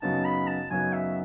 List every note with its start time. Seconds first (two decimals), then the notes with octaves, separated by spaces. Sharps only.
0.02 F#2 C#3 F#3 B3 D#4 A5
0.25 B5
0.48 A5
0.70 F#2 C#3 F#3 B3 D#4 G#5
0.93 E5